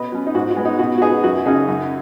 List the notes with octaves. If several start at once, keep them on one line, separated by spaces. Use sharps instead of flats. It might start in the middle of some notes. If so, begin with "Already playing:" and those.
Already playing: B2 B4 D#5
F#3 C#4
D#4
G#2 F#4
F#4
G#3 B3
D#4
B2 F#4
F#4
B3 D#4 G#4
F#2 F#4
C#3 F#3 C#4 D#4 G#4
F#2